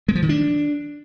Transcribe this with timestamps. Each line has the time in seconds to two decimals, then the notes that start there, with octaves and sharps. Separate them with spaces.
0.08 G#3
0.15 F3
0.22 D#3
0.29 D4